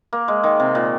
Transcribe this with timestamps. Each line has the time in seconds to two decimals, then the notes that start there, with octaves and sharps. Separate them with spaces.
0.13 A#3
0.28 G#3
0.44 D#3
0.60 C3
0.75 A#2